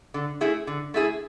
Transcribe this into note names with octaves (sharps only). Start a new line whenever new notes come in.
D3
A3 E4 G#4
D3
A3 E4 G#4